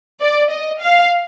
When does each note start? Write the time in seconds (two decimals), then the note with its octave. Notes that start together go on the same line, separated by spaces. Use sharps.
0.20 D5
0.50 D#5
0.81 F5